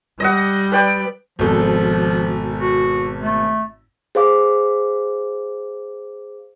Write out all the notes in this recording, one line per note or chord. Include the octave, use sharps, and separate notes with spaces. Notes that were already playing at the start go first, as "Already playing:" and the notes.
G3 D#5 F#5
B4 D5 G5
G#1 B2 F3 A4
F#4
A3
G#4 C5 F5 D6